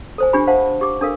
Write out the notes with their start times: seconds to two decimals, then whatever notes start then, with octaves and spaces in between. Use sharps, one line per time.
0.18 A4 C5 G#5
0.33 D4 F4 G4 G#5 B5
0.47 C5 F5 F#5 A5
0.81 G4 D6
1.01 D4 A4 A#4 F5